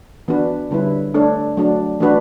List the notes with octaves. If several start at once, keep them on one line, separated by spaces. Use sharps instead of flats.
E3 B3 D4 F#4 B4
D3 G3 C#4 E4 B4
A3 D4 A4 C#5
F#3 A3 D4 F#4
E3 A3 D4 F#4 B4